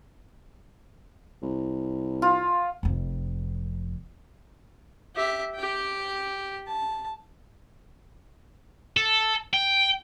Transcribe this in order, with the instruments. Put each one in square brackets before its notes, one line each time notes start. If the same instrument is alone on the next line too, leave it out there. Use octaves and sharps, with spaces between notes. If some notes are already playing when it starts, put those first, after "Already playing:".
[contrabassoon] C2
[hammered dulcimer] F4
[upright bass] F1 F2
[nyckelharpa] G4 E5
G4 G5
A5
[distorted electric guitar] A4
G5